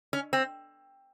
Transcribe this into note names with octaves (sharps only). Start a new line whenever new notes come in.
C#4
C4